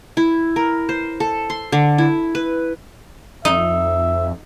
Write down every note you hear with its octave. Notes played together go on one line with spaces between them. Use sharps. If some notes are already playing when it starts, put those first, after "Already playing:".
E4
A#4
C5
A4
C6
D3
E4
B4
F2 D#4 E5